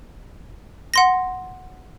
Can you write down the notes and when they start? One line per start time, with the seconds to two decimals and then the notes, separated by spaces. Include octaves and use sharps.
0.94 F#5 C6 A#6